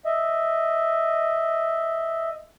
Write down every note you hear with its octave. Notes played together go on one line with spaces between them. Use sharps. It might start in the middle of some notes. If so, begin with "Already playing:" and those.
D#5 E5